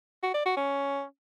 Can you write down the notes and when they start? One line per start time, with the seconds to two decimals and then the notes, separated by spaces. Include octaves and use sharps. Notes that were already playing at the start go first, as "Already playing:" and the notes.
0.23 F#4
0.34 D5
0.45 F#4
0.57 C#4